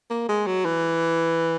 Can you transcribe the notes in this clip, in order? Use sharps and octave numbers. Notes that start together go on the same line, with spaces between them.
A#3
G#3
F#3
E3